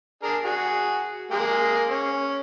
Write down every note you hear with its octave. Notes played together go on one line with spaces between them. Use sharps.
D4 G#4 A#4
F#4 G#4
G#3 A#3 G#4
C#4